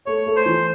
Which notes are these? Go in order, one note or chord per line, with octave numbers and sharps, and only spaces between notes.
A3 C#5
A3
C5
E3